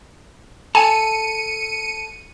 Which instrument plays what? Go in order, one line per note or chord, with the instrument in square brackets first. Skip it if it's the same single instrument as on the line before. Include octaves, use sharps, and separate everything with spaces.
[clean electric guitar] A4 [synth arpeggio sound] G#5 [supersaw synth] C#7 D#7